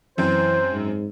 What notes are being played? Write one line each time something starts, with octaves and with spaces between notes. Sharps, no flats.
F#2 E3 C4 C5
G#2